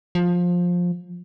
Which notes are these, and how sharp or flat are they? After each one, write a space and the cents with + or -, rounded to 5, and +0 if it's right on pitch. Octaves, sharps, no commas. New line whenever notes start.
F3 +15